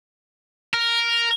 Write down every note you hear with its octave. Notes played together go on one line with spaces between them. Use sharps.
A#4